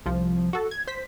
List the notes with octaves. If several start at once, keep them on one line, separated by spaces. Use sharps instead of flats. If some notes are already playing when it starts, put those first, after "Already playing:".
C2 F3
F#4 A4
G#6
C5 B6